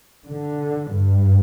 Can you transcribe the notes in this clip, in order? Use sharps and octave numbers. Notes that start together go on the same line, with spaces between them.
D3
G2